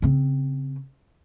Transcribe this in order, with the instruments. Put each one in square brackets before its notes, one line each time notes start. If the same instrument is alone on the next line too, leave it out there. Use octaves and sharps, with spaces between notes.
[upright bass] C#3 C4